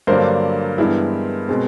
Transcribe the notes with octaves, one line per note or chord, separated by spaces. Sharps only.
G2 D3 F#3 A#3 D4 A#4 C5
G2 E3 G#3 B3 E4
B2 G#3 C4